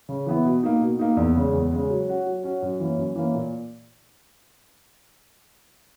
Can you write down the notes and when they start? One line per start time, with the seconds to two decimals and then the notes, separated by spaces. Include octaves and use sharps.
0.09 C#3
0.26 E3 B3 E4
0.45 B2
0.63 A#3 D#4
0.81 B2
0.99 A#3 D#4
1.17 E2
1.35 C#3 G#3
1.53 E2
1.71 C#3 G#3
1.90 F#3
2.08 C#4 F#4
2.26 F#3
2.43 C#4 F#4
2.62 F#2
2.80 E3 A#3 C#4
2.97 F#2
3.16 E3 A#3 C#4
3.35 A#2